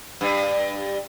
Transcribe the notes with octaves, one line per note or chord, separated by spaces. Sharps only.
G2